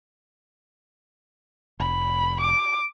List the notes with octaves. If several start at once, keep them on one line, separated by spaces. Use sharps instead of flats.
F1 B5
D6